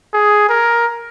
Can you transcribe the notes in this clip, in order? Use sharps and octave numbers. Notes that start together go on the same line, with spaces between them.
G#4
A#4